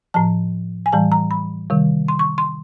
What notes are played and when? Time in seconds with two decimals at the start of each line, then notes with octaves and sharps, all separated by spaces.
0.14 A2 F3 A5
0.86 G#5
0.92 A2 E3 G3 A5
1.12 A#5
1.31 B5
1.70 C3 D#3 G3
2.08 C6
2.19 C#6
2.38 C6